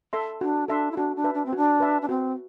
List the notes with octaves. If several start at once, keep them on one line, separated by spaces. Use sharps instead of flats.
A4 E5 A5 C6
D4 F#4
D4 A4 E5 A5 C6
E4
D4 F#4
D4
B4 E5 A5
D4
C4
D4 F#4
B4 E5 A5
D4
C4 F#4